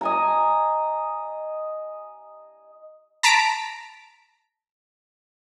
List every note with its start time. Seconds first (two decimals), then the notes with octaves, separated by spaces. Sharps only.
0.01 D#5 G#5 A#5
3.23 A5 A#5 B6 D7